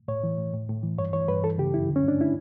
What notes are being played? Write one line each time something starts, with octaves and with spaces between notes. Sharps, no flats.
A2 C#5
E3
A2
A2
A2
E3
G2 C#5
E3 C#5
G2 B4
E3 A4
C#3 G4
F#2 E4
D3
C#4
G2 D4
E4